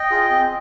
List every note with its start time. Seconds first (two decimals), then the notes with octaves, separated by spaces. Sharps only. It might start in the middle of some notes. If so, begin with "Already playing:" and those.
Already playing: D#5 G5
0.11 F4 G#4
0.30 C4